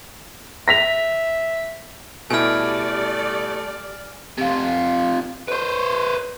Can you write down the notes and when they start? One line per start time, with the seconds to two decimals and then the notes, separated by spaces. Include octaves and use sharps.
0.68 E5 A#6 B6 F7
2.30 B2 G3 A3 E4 D5 G#5 F6
4.38 C3 F4
5.48 B4 C5